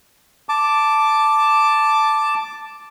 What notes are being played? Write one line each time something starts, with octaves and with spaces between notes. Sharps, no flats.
A5 D6